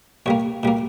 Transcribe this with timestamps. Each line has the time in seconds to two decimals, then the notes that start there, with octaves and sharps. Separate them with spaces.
0.26 A#2 G3 A#3 C#5
0.63 A#2 G3 A#3